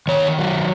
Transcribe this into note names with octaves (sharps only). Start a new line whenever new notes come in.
D#3 C#5
F#3